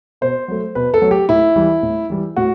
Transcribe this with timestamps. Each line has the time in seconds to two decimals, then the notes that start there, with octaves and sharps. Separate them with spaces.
0.21 B2 C5
0.48 F#3 A3
0.75 B2 B4
0.94 A4
1.02 F#3 A3
1.11 G4
1.29 A2 E4
1.56 E3 G3
1.83 A2
2.10 E3 G3
2.37 A2 F#4